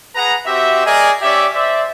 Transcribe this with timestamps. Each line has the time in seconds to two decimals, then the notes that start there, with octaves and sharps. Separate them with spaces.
0.16 G#4 B4 F#5 A#5
0.46 C4 F#4 G4 E5
0.85 G#4 A#4 D5 D#5 G#5
1.22 C#4 G4 D5 E5
1.54 C5 D5 E5